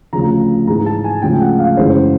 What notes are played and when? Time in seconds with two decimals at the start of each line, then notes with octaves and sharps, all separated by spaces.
0.13 D2 C#3 F3 A#5
0.67 G#2 E3 G#3 A#5
0.86 A5
1.04 G#5
1.22 D2 C#3 F3 G#3 G5
1.41 F#5
1.59 F5
1.77 F#2 C#3 E3 G#3 C5